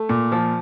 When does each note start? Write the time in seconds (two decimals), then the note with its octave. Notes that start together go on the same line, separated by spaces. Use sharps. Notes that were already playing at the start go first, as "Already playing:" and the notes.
Already playing: A3
0.09 A#2
0.32 F3